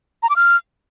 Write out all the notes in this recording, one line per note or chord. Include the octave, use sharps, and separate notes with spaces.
A#5
D6
F6